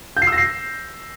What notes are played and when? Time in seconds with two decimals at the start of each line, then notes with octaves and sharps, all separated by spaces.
0.17 G6
0.22 C7
0.27 E6
0.32 A#6
0.38 C7